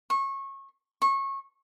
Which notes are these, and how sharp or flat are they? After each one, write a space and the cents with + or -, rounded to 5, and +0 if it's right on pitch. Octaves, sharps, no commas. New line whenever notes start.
C#6 -25
C#6 -25